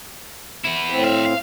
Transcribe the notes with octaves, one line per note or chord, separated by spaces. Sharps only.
B3 E4
A2 C4
E5 F5
F5